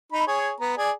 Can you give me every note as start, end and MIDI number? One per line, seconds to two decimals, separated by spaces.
0.12 0.26 63
0.12 0.26 83
0.27 0.51 68
0.27 0.51 73
0.60 0.73 59
0.60 0.73 82
0.77 0.91 68
0.77 0.91 74